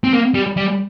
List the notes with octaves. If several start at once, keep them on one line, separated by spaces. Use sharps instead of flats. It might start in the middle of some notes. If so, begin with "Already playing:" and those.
C4
A#3
G3
G3